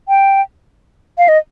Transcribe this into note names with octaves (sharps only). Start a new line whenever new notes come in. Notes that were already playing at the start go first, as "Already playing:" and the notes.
G5
F5
D#5